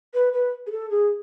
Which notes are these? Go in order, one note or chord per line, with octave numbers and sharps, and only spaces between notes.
B4
B4
G#4
A4
G#4